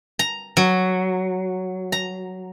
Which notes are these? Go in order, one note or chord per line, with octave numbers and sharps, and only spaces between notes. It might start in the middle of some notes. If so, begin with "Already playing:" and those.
A#5
F#3
A#5